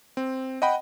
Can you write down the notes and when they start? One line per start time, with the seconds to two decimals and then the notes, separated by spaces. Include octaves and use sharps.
0.17 C4
0.62 D#5 F#5 G5 B5